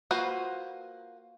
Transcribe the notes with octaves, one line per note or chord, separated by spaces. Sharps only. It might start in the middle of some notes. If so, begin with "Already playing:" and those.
A#3 F4 F#4 B4 C5